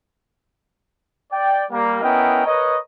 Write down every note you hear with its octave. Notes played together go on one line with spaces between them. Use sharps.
D5 G5
G3 A#3
B3 C#4 E4 A#4 D#5 G5
A#4 B4 C#5 D#5